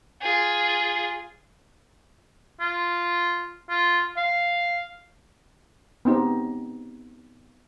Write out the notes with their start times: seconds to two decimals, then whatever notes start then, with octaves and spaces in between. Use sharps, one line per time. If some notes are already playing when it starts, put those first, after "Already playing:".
0.22 F4 G#4
2.60 F4
3.70 F4
4.17 F5
6.05 B3 C4 D#4 G4